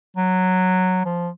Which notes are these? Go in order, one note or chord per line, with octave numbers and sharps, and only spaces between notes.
F#3
F3